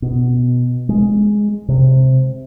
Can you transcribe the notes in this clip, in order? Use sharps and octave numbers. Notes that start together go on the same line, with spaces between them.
B2
G#3
C3